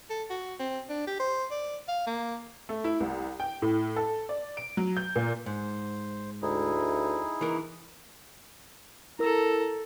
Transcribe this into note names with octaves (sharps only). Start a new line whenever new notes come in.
A4
F#4
C4
D4
G4
C5
D5
F5
A#3
A3
E4
C2
G5
A2
A4
D5
D7
F#3
G6
A#2
G#2 C5
D2 D#4 E4 G#4
E3 A#4
E4 A4 A#4 A#5 E6